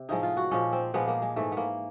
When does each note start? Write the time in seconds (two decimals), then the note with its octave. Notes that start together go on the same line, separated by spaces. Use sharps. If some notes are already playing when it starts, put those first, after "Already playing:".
Already playing: C3
0.09 A2 F3 G#3 D#4
0.23 F4
0.37 F#4
0.51 A#2 F3 G#3 C#4
0.72 C4
0.94 A#2 F3 G#3 B3
1.08 A#3
1.22 G#3
1.36 G#2 E3 G#3 A3
1.52 B3
1.57 A#3